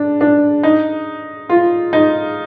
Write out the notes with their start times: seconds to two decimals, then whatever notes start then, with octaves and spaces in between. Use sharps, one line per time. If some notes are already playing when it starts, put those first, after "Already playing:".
Already playing: D4
0.21 D4
0.63 D#4
1.49 F4
1.93 D#4